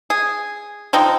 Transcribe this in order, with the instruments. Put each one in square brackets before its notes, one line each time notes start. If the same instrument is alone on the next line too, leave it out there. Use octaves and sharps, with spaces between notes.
[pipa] G#4
[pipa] D3 F3 D#4 [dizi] G5